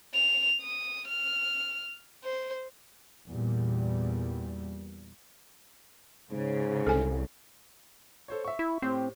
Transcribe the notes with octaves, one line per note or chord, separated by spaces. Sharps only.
F7
D#6
F6
C5
E2 A#2 G3
G#2 C#3
C2 A4 G#5
A4 C5 C#5
E5 C#6
E4
A2 C4 G4 C5